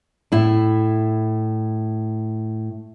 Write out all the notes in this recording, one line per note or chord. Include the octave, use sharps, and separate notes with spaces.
A2 E4